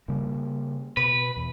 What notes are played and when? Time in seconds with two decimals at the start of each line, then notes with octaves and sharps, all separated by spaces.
0.08 C#3 G3 A#3
0.97 B2 B4
1.37 E2